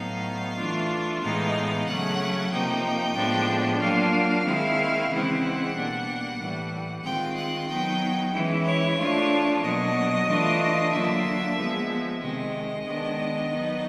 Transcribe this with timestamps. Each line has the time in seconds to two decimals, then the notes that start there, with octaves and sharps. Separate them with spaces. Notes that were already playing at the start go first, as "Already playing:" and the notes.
Already playing: A2 F#3 B3 D#4 F5
0.57 E3 A3 D4 F4
1.22 A2 E3 G#3 B3 D#4 F5
1.86 C#3 F#3 A3 C#4 F#5
2.51 C3 F3 A#3 D#4 G5
3.15 A2 F3 G#3 B3 D4
3.80 F#3 A#3 D4 F4 F5
4.44 D#3 G#3 C4 E4
5.09 C#3 E3 G#3 C4 E4 F#5
5.74 B2 G3 A#3 D4
6.38 A2 E3 G3
7.03 D#3 G#3 C4 F4 G5
7.36 F#5
7.68 F#3 B3 D#4 G5
8.33 E3 G#3 C#4 E4
8.65 C#5
8.97 F3 A3 D4 F4
9.61 B2 F#3 A#3 D4 D#5
10.26 E3 A3 D4 F4
10.90 D3 F#3 A#3 D4 F4 E5
11.55 F3 G#3 B3
12.20 C3 D#3 G#3 D#5
12.84 D#3 G#3 B3 D4
13.50 F#3 B3 D#4